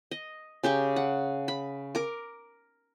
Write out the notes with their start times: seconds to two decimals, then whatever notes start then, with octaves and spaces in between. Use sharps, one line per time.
0.11 D#5
0.63 C#3 G4 G5 C#6
0.96 F#5
1.48 B5
1.95 A#4 D6